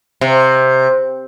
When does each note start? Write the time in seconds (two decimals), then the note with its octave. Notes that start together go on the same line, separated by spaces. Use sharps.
0.21 C3